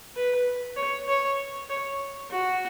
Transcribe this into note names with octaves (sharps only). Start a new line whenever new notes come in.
B4
C#5
C#5
C#5
F#4